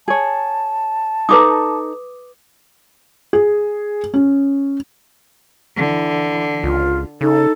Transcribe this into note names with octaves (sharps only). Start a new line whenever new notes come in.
G#4 C#5 A5
D#4 A4 B4 A#5 D6 D#6
G#4
C#4
D3 E3
C#2 F4
C#3 D#4 A4